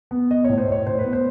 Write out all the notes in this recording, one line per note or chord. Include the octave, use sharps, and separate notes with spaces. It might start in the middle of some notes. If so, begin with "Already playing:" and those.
B3
B3 D#5
A2 C#5
C5
A2 C#5
A2 C5
B4
B3
C5